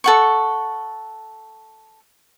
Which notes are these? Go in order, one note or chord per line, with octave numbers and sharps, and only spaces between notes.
A4 F#5 C#6